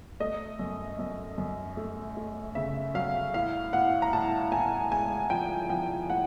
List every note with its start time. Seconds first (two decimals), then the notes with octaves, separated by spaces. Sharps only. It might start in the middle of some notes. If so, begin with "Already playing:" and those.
0.20 A3 D#5
0.59 F#2
0.99 F#2
1.38 F#2
1.77 A3
2.17 A3
2.55 C#3 E5
2.94 F#3 F5
3.34 A2 F5
3.73 A2 F#5
4.02 A#5
4.13 A2 A5
4.52 A2 G#5
4.91 G#3 G#5
5.30 F3 G5
5.70 F3 G5
6.09 A2 F#5